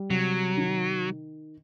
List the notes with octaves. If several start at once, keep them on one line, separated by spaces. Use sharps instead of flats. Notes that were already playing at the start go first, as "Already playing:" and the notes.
Already playing: G3
C3 F#3
D#3